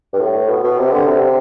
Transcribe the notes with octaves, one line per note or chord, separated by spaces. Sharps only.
G2
A2
B2
B2
C3
D3
C3